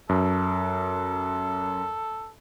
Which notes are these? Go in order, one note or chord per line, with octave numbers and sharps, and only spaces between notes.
F#2 A4